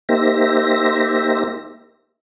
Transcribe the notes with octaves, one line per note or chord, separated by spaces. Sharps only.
A#3 D#4 G4 C5 E5 A#6